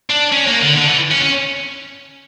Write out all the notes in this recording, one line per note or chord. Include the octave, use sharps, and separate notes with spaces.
D4
C#4
A#3
D3
D3
E3
C#4
C#4